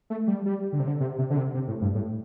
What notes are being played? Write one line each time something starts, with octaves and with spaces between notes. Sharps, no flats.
A3
G3
G3
D3
C3
D3
C3
C3
D3
C3
C3
A2
G2
A2